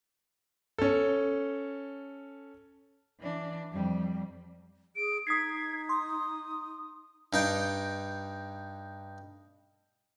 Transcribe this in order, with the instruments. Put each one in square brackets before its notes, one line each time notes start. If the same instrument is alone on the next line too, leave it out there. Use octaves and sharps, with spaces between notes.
[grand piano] C#4 A4
[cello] E3 D4
F2 G3
[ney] G#4 [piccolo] D7
[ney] D#4 [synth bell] D#6 B6 C7 [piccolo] G#6
[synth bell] C6 [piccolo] D#6
[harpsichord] G2 D#4 G5